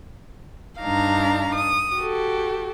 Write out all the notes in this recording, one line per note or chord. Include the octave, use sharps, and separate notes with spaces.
G2 D4 D#4 F5 A#5
D#6
F#4 G4 A4